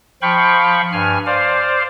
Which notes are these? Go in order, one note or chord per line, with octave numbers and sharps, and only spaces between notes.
F3 F5 G5 B5 C#6
G2 G#5 F6
C5 D5 F5